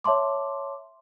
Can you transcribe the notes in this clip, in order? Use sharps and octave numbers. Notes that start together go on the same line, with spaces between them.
C#5 E5 A5 C6 D6